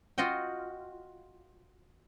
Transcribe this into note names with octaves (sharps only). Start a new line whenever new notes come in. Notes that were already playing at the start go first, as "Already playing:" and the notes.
F4 F#4 D#5 F#5 G5